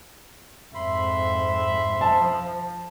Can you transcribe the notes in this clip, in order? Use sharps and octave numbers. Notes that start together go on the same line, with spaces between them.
F2 G#2 E5 B5 C6
F3 A5